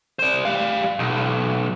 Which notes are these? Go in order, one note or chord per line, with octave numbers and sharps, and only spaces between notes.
C5 D5
G3 F5
B1